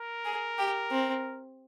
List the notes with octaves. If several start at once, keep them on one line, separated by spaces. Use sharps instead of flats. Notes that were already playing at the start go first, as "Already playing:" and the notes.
Already playing: A#4
G#4
G4
C4